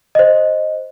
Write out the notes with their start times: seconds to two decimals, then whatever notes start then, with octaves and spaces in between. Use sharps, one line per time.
0.15 C5 D#5